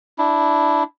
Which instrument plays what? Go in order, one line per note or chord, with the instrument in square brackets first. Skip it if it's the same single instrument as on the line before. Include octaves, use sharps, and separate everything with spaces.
[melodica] D4 E4